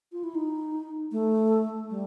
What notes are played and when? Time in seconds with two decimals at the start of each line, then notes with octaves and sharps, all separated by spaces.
0.12 F4
0.24 E4
0.35 D#4
1.12 A3
1.90 G3